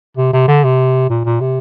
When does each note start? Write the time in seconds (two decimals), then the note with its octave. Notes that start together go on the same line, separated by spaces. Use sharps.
0.17 C3
0.33 C3
0.48 D3
0.64 C3
1.10 A#2
1.25 A#2
1.41 C3